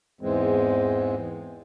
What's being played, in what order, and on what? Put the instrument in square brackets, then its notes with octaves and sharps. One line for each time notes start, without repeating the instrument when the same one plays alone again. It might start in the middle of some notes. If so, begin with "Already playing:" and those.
[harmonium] E2 G#2 E3 G#3 C4